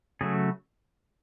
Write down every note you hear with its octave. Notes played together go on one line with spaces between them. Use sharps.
C#3 F#3 A3 G#4